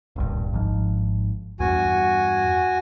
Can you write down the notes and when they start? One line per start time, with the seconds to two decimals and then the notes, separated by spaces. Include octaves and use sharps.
0.16 D1 A#1 G2
0.53 G#1 G#2 F3
1.60 E2 G2 F#4 G#5